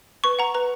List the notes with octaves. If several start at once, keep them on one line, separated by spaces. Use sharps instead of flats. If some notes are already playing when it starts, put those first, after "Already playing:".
B4 C#6
F#5 A#5
B4 A#5